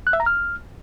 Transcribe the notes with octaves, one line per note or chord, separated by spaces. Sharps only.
F#6
E5
A#5
F6